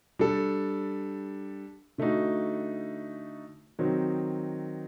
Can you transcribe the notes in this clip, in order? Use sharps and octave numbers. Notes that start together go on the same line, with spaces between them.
G3 D4 A4
D3 A3 D#4 F#4
D#3 F#3 C4 D#4